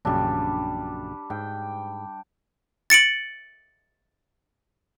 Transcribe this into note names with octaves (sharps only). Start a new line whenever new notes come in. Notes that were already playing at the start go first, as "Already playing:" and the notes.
A#1 F#2 C#3 G3 D4
G#2 G5
A6 C#7 D7 F#7